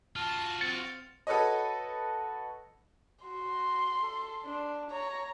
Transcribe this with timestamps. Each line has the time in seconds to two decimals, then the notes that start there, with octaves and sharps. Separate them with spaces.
0.16 F4 F#4 A5 F6 E7
0.61 C4 F5 A6 C#7
1.27 F#4 A4 B4 C#5 D#5
3.25 F#4 C6
4.01 A4
4.45 D4
4.91 C#5 A#5